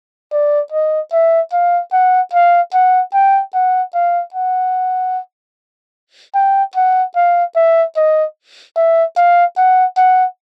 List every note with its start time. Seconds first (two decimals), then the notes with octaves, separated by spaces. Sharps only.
0.32 D5
0.72 D#5
1.12 E5
1.53 F5
1.93 F#5
2.33 F5
2.73 F#5
3.13 G5
3.54 F#5
3.94 F5
4.34 F#5
6.35 G5
6.75 F#5
7.16 F5
7.56 E5
7.96 D#5
8.76 E5
9.17 F5
9.57 F#5
9.97 F#5